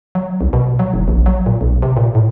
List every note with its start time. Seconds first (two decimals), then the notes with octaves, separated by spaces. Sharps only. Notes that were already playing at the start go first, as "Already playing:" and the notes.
0.15 F#3
0.41 C2
0.53 B2
0.79 F#3
0.94 F#1
1.08 A#1
1.26 F#3
1.46 A#2
1.61 B1
1.82 C3
1.97 A#2
2.15 A2